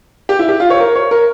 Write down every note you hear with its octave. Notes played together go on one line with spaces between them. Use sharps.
G4
E4
G4
F4
C#5
A#4
C#5
A#4